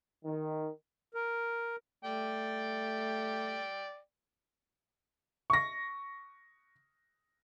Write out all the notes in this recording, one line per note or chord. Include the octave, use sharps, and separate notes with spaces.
D#3
A#4
A3 D5 G5
C#6 A#6